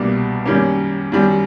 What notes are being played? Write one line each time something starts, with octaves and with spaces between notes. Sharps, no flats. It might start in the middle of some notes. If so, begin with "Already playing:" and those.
Already playing: C2 B2 G3 A#3 D4
F#2 D#3 G3 A#3 C#4
F#2 D#3 G3